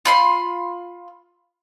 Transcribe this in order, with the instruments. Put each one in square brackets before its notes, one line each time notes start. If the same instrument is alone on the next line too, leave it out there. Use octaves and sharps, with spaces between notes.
[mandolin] F4 B5 C6